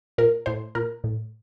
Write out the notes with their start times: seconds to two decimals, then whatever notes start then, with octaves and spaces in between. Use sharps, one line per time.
0.18 A#2 A#4
0.46 A2 C5
0.75 A#2 A#4
1.04 A2